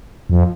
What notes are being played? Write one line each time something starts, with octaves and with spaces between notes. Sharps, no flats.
F2